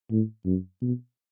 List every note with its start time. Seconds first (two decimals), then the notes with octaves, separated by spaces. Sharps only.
0.11 A2
0.45 F#2
0.82 B2